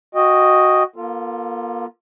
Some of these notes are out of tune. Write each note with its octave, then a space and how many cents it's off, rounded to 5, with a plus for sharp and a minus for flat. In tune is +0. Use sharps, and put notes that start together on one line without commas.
F#4 +0 D#5 +0 G5 +25
A#3 +40 F4 +0 A4 +35